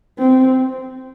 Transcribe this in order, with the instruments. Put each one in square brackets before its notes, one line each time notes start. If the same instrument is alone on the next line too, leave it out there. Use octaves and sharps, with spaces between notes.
[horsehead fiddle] C4